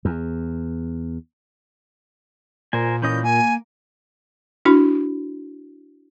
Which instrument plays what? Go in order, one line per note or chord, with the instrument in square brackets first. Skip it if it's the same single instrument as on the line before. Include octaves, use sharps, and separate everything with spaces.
[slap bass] E2
[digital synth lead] A#2 [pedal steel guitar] A#4 C5 G#5
[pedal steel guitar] E3 C#4 D#5 [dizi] G6
[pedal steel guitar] A#3 [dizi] G#5
[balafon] D4 E4 F#4 B5